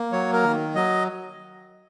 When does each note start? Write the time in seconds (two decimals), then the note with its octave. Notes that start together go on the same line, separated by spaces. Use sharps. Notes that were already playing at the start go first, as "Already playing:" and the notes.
Already playing: A#3
0.12 F#3 C#5
0.33 A#4
0.43 D#3
0.75 F#3 D#5